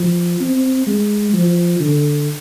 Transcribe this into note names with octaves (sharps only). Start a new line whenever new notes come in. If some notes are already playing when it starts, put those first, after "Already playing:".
Already playing: F3
C4
G#3
F3
D3